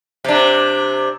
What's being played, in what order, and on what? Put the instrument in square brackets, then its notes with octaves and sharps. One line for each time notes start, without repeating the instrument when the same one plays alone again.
[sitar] C3 D4